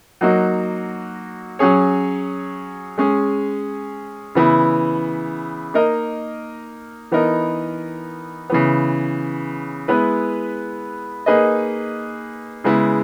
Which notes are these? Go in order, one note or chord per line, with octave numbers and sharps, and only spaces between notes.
F#3 A#3 D#4 F#4
F#3 C#4 G#4 C#5
G#3 C#4 G#4
C#3 E3 B3 E4
A#3 D#4 A#4 D#5
E3 B3 D#4 A#4
C#3 E3 B3
G#3 B3 E4 B4
A#3 D#4 G#4 B4 D#5
C#3 G#3 B3 E4